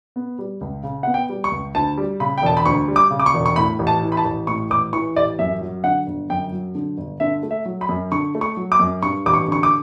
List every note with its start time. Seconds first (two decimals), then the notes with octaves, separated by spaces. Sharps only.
0.16 B3
0.39 G3
0.61 C#2
0.83 C#3
1.03 B3 F#5
1.14 G5
1.29 G3
1.44 C#6
1.51 C#2
1.75 D2 A5
1.98 G3
2.20 C#3 B5
2.38 G5
2.42 E1 A5
2.57 B5
2.65 D2 C#6
2.88 G3
2.96 D6
3.11 C#3
3.20 D6
3.26 C#6
3.34 E1
3.46 C#6
3.56 A2 B5
3.79 A1
3.87 A5
4.02 E3
4.12 B5
4.17 A5
4.25 A1
4.47 A2 C#6
4.70 A1 D6
4.93 E3 C#6
5.16 A1 D5
5.39 F#2 E5
5.61 F#3
5.83 D3 F#5
6.07 G1
6.30 F#2 G5
6.52 F#3
6.75 D3
6.98 G1
7.20 D3 E5
7.43 A3
7.51 E5
7.66 F#3
7.81 B5
7.89 F#2
8.12 D3 C#6
8.35 A3
8.41 C#6
8.57 F#3
8.72 D6
8.80 F#2
9.03 G2 C#6
9.26 A1 D6
9.33 C#6
9.48 D3 C#6
9.63 D6